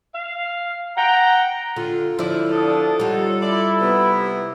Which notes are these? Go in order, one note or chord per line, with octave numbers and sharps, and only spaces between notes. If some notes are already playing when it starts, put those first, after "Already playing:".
F5
F#5 G5 A#5
D3 F4
D3 F3 E4 D5
D4 A4 D#6
G3 D#4 F4 C#5 F#5
E4 D5
C3 B3